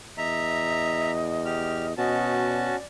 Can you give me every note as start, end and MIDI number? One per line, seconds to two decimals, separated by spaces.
0.18 1.96 40
0.18 1.94 75
0.18 1.11 76
0.18 1.11 82
1.45 1.86 67
1.45 1.86 89
1.98 2.72 47
1.98 2.76 61
1.98 2.76 66
1.98 2.33 75
1.98 2.76 81
2.48 2.85 74